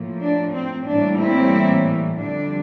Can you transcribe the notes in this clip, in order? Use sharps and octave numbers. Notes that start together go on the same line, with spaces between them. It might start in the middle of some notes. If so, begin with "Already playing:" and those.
Already playing: A2 F3 A#3
D4
C4
A2 E3 G3 A#3 D4
C4 E4
F2 D3 G3 D4